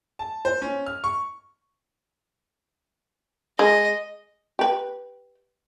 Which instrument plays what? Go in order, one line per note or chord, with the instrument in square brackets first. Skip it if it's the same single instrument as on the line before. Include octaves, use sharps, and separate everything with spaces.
[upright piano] A5
C5
C#4
F6
C#6
[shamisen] G#3 [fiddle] D#5
[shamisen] G4 B4